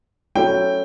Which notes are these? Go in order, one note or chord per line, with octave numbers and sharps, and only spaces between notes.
F#3 A3 C#4 E4 G5